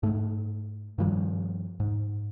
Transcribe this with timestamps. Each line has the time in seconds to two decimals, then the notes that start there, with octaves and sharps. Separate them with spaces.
0.03 G#2 A3
0.98 G2 D#3 F3 G3
1.80 G#2